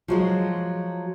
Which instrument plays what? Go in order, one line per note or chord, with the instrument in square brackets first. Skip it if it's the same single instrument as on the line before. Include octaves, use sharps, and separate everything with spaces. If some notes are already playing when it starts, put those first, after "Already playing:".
[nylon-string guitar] F3 F#3 G#3